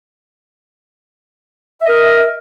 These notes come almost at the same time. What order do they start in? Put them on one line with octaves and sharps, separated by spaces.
E5 D#5 A#4